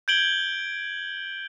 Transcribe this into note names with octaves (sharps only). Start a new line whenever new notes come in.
G6 G#6 D7 F#7 G7